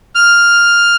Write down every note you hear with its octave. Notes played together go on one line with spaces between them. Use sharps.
F6